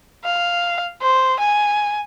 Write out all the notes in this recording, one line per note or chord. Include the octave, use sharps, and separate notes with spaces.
F5
C5
G#5